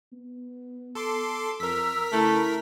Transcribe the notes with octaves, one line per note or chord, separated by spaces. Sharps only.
B3
A4 C6 D6
F2 A#4 E6 B6
C#3 A3 E4